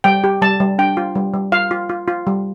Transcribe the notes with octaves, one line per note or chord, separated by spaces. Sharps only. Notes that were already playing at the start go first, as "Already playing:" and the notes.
G3 G5
G4
G3 A5
G3
D4 G5
F4
G3
G3
F4 F5
F4
F4
F4
G3